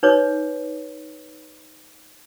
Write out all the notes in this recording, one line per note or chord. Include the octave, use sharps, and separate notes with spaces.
D#4 B4 C#5 D6